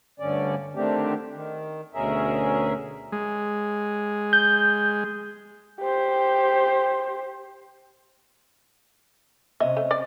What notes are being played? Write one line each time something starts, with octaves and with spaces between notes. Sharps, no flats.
D2 G2 D3 C#4 D5
D3 D#3 A3 C4 D4 G4
D#3
D2 B2 C#4 G#4 A#4 E5
G#3
G6
G4 C5
C3 C#4 D#5 E5
A3
D5